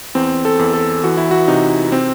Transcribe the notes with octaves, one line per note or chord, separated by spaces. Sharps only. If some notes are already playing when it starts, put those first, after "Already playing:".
E2 C4
A4
E2
A4
E3 F#4
E4
F#4
C3 D#4
C4